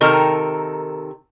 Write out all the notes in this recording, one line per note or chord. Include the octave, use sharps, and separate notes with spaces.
C3 D#3 D#4 A4 A#4